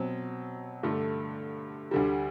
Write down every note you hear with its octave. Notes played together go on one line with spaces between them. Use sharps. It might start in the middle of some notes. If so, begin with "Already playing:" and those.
Already playing: B2 F#3 C4
G2 D3 A3
D2 D3 G3